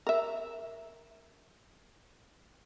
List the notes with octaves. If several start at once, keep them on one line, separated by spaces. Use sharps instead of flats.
A#4 E5